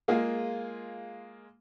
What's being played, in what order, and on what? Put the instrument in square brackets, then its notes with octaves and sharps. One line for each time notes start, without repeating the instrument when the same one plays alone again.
[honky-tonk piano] G#3 A#3 F4 G#4